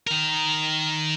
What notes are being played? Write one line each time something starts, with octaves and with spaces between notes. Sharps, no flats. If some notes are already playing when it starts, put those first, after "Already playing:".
D#3 A#4